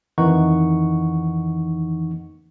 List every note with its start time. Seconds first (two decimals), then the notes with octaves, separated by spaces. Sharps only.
0.18 F2 D#3 E3 D#4 F#5 C#6